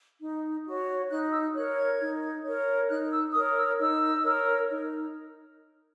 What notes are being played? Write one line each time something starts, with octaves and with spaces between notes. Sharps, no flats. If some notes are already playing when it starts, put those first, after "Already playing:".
D#4
F#4 C#5
D#4 F#6
E6
A#4 C#5 F#6
G#6
D#4
A#4 C#5
D#4 F#6
E6
A#4 C#5 D#6
E6
D#4 E6
A#4 C#5
D#4